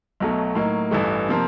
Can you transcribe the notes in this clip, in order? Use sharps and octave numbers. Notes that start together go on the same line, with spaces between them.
B1 B2 F#3 A3
A2 F#3 A#3 D#4
A1 G2 E3 A3
C3 F3 A#3